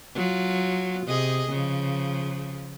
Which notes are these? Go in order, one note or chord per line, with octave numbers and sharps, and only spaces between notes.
F#3 F4
C3 G#4 D#5
C#3 F3